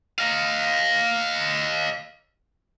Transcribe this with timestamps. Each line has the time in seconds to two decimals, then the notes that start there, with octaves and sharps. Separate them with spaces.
0.19 D#5 F5